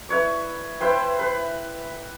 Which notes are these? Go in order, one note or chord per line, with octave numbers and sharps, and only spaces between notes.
E4 B4 C#5 D5
E4 B4 C5 G5
B4